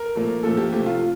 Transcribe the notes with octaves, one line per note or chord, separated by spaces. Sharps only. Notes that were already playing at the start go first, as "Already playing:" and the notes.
Already playing: A#4
A#2 F3 A3
A#2 F3 A3 A4
G4
C3 F3 A3 G4
F4